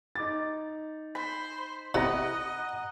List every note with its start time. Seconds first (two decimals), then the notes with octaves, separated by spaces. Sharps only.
0.15 D#4 D6 A6
1.15 C5 B5
1.94 C3 E4 D#5 F#5 A#5